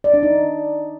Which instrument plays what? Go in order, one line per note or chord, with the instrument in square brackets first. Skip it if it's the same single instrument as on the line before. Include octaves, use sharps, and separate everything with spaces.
[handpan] D5
D4
D#4